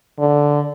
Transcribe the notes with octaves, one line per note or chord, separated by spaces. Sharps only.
D3